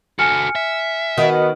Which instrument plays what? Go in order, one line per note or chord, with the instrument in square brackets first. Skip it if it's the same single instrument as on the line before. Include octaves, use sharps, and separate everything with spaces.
[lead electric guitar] F#4 A4 [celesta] G#5 F6 C#7
[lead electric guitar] E5
[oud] D#3 [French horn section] B3 F#4 D#5